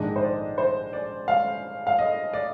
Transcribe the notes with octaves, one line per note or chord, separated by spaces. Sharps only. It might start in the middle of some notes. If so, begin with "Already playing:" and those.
Already playing: A#1 G#2 D#3 G#3 D4 D#5
C5
D5
C5
D5
F5
F5
D#5
D5